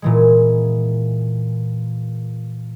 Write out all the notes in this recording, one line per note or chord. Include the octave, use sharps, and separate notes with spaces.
A#2 E3 G#3